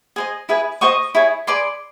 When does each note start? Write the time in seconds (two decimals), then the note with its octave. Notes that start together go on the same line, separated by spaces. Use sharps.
0.16 G#4 C5 D#5
0.49 E4 G#4 B4
0.81 G4 C5 D#5 C#6 D#6
1.15 E4 G#4 C#5
1.47 G#4 B4 D5 C6 D6